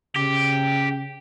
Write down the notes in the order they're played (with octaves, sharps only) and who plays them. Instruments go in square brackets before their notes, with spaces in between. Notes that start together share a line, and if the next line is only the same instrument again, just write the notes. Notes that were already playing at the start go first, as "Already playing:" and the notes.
[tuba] C#3 [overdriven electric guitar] G4